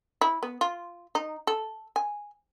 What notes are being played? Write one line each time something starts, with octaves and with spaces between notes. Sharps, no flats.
E4
B3
F4
D#4
A4
G#5